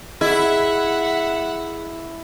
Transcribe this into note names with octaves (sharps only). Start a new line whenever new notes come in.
E4 G#4 D#5 E5 F#5